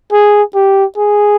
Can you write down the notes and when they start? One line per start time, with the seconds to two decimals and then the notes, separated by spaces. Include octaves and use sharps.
0.12 G#4
0.55 G4
0.97 G#4